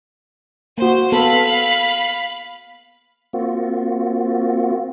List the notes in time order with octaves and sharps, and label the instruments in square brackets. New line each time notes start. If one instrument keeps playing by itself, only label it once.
[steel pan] A#3 F#4 [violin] C5
[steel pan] B3 A4 [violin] F5 B5
[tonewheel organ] A#3 C4 F4 F#4